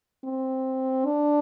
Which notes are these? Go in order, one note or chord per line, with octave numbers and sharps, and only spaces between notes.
C4
D4